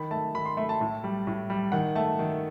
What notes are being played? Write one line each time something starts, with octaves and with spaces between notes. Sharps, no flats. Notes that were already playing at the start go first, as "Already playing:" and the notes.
Already playing: D#3 B5
A3 A5
D#3 B5
C6
A3 B5
A5
A2
G3
A2
G3
D#3 F#5
A3 A5
D#3